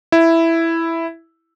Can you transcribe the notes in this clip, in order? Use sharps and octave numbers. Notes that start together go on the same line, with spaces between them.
E4